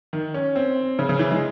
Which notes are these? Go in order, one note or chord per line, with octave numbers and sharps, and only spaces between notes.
D#3
C#4
C4
C#3
C#3
E3
G#3